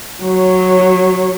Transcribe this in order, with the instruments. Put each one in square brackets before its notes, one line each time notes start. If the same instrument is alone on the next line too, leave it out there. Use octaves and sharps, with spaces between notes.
[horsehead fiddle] F#3 C#5